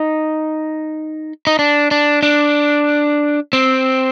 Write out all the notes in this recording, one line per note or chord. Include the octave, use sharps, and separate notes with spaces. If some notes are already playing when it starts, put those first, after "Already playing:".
Already playing: D#4
D#4
D4
D4
D4
C4